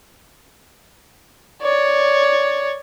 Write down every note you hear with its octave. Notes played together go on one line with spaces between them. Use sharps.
C#5 D5